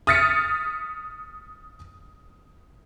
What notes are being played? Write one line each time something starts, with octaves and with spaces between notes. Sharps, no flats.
D#6 F6 A6 B6 C#7